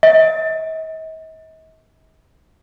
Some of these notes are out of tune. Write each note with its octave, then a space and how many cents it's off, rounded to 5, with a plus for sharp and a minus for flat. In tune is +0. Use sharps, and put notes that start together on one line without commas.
D#5 +45